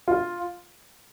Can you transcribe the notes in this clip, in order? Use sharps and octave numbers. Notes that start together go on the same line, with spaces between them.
F4